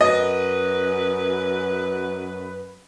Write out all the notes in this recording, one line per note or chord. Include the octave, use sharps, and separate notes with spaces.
F#2 B4 D#5